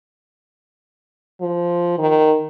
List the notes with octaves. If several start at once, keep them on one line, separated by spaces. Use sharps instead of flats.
F3
D#3